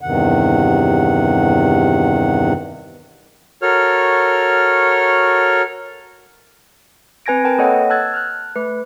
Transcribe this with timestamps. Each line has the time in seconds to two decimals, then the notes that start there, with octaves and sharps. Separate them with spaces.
0.01 E2 G2 C3 D#3 F#5
3.62 F#4 A4 A#4 C#5 F6
7.26 C4 B4 G#5 G#6 A#6 D7
7.44 A#4 B4 G5 A5
7.58 A#3 A4 C#5 D#5 F#5
7.90 A5 E6 F#6 G#6 A6
8.14 F6 F#6
8.56 A3 B4